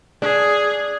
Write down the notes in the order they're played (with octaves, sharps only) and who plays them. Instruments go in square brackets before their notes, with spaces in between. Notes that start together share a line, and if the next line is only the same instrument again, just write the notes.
[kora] D4 [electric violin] G#4